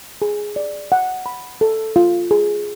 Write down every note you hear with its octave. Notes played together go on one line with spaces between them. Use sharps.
G#4
D5
F#5
B5
A4
F4
G#4